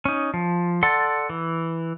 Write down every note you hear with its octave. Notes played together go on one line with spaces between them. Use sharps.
C#4 D#4
F3
A4 D5 F#5 A5 C6
E3